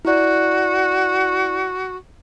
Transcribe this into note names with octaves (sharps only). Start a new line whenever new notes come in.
E4 F#4 D5